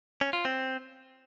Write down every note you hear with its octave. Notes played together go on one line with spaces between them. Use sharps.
C#4
F4
C4